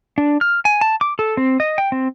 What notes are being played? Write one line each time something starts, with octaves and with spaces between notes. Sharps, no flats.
D4
F6
G#5
A5
D6
A4
C4
D#5
G5
C4